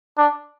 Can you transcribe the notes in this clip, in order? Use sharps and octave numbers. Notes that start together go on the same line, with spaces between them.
D4